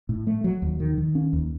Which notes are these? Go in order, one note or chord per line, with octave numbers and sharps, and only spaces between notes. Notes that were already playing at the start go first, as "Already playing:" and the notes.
A2
A3
F#3
D#2
D#3
D#3
C#4
D#2